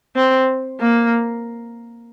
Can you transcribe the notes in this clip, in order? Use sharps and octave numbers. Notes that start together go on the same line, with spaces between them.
C4
A#3